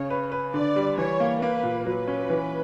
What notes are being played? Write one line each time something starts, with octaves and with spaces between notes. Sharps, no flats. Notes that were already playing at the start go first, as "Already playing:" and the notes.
Already playing: C#3 C#5
B4
B4
D3 D5
G3
E3 C#5
A#3
A#3 B4
A#2
F#3 B4
C#4
E3